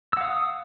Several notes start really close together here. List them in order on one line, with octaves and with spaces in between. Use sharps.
E6 F#5 F5 D#6